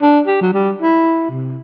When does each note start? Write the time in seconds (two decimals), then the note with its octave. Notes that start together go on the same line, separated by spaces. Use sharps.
0.02 D4
0.27 G4
0.42 F#3
0.54 G3
0.82 E4
1.31 C3